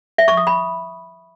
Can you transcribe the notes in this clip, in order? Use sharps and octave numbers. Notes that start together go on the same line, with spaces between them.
E5
C#6
D#6
B5